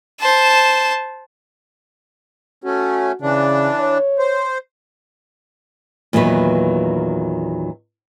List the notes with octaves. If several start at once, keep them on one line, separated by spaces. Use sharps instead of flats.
C5 A5
A3 C#4 F#4
C#3 E3 D4
C#5
C5
E2 A#2 D#3 F#3 B4